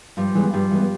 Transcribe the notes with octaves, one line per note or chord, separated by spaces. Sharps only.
G2 F3 G3
E3 G#3 B3
G2 F3 G3
E3 G#3 B3